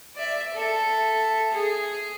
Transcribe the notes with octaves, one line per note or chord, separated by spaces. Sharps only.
D5 E5
A4 E5
G#4